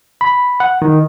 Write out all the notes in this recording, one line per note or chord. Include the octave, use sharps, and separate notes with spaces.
B5
F#5
D#3